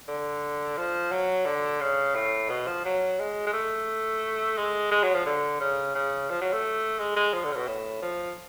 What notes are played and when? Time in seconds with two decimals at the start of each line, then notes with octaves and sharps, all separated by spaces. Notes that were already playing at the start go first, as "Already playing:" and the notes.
0.08 D3
0.78 F3
1.12 F#3
1.46 D3
1.81 C#3
2.16 A2
2.49 B2
2.67 F3
2.85 F#3
3.19 G#3
3.47 G#3
3.53 A3
4.58 G#3
4.91 G#3
5.03 F#3
5.15 F3
5.26 D3
5.60 C#3
5.95 C#3
6.30 F3
6.41 F#3
6.53 A3
6.99 G#3
7.16 G#3
7.33 F3
7.44 D3
7.52 C#3
7.57 B2
7.68 A2
8.02 F3